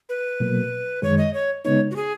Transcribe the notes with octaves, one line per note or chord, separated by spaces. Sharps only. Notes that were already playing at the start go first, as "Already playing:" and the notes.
B4
B2 F#3 A#3
F#2 D#3 G#3 C#5
D#5
C#5
C#3 G#3 B3 D#4 C#5
F#4
G#4